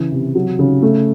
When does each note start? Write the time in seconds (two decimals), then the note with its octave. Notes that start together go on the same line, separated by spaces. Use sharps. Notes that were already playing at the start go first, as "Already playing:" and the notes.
Already playing: C#3 E3
0.12 C3
0.35 F#3
0.59 C#3
0.82 A3